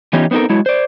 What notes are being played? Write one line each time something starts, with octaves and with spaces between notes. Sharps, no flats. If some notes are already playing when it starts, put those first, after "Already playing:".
E3 B3 C#4 D#4 F4 G4
B3 C4 D#4 A4 A#4
F#3 G#3 E4 F#4
C5 D5